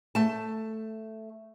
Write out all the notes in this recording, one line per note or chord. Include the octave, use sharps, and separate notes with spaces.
A3 A5